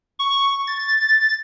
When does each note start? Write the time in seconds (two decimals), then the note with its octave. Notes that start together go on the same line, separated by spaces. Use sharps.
0.19 C#6
0.67 A6